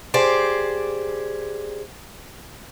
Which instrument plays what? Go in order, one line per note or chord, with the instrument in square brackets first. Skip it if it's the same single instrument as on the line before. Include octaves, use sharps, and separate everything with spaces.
[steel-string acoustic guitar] G4 G#4 C5 D5